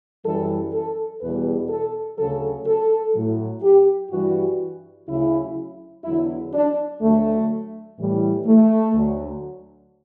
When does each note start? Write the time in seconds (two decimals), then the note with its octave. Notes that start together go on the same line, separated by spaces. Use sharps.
0.25 F#2 E3 G3 A4
0.73 A4
1.22 E2 B2 G3 B4
1.70 A4
2.18 D2 C#3 F#3 A4
2.67 A4
3.15 A2 F#3
3.63 G4
4.11 G2 E3 G3 F#4
5.08 D2 C#3 F#3 E4
6.04 E2 D3 F#3 E4
6.53 D4
7.01 D2 D3 F#3 A3
7.98 A2 E3 G3
8.47 A3
8.95 D2 D3 F#3